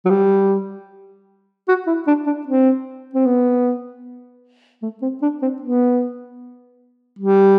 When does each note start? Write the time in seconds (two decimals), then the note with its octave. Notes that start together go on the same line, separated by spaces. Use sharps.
0.05 F#3
0.10 G3
1.68 F#4
1.87 E4
2.07 D4
2.27 D4
2.47 C4
3.14 C4
3.26 B3
4.83 A3
5.02 C4
5.22 D4
5.42 C4
5.62 B3
7.19 G3